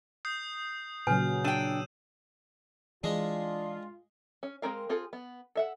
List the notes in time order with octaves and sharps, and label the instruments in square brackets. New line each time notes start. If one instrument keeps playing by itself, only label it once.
[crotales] D#6 G6 C7
[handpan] A#2 C#3 F#3 [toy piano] B4 G#5 [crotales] G6
[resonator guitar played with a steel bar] D4 G5 [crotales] E6 D#7 E7
[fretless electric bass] E3 [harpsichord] G#3 G#4 [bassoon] D4 [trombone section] F4
[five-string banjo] C#4
G#3 C4 A#4 F5
C4 F4 G#4 A4
B3
A4 E5 F#5